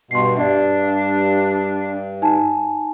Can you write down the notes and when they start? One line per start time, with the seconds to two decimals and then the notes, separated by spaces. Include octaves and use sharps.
0.11 G2 B2 C6 C7
0.37 G2 D4 D5 E5
2.22 D#4 G#5 A5